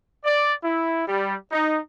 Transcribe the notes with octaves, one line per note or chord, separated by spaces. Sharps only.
D5
E4
G3
D#4